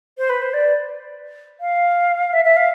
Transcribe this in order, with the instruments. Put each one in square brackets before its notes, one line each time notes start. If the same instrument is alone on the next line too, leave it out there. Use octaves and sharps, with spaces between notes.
[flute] C5
B4
C5
D5
F5
E5
E5
F5